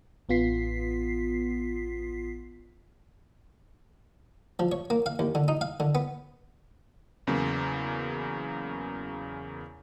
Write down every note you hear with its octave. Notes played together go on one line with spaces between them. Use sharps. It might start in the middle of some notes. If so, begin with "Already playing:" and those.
A1 B3 F4 B6 C7
F3
C#5
A#3
F5
D#2
D3
D#4
F5
D3
B3
E2 C#3 F#3 A#3